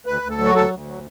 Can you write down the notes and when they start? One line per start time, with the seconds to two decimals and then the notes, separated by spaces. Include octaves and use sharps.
0.06 D2 B4
0.22 D2
0.30 A4
0.38 F#3
0.45 F#4
0.55 D2 A4
0.70 D2
0.87 F#3